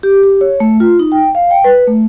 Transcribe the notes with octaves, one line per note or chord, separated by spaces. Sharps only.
G4
G4
C#5
A3
F4
D#4
G5
F5
G5
B4
A3